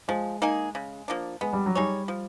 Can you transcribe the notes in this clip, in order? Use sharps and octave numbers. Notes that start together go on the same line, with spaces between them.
F3 G#3
A#3 D#4 G#4
C#3
F3 A#3 D4
G#3 B3
G3
F#3
G3 D#4 G#4 C#5
F3